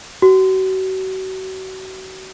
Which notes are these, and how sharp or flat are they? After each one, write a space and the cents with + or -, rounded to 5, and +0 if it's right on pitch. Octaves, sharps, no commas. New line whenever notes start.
F#4 +35